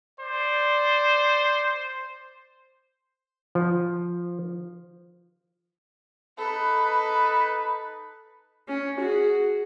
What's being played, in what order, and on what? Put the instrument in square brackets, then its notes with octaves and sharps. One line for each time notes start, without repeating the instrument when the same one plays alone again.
[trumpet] C5 [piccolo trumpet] D5
[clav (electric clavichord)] F3
[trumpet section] D#4 B4 [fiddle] A4
[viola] C#4
F#4 G#4